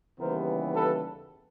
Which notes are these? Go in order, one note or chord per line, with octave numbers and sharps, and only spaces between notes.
D#2 C#3 E3 G3 B3 A#4 C5
A4 B4